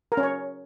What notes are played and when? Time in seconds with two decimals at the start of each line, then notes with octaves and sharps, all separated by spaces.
0.12 A#4
0.17 C#4
0.23 C#5